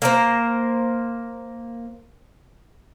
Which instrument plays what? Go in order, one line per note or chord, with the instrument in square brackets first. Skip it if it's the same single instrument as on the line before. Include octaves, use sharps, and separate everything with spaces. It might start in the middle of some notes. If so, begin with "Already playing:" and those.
[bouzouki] A#3 A#4 C5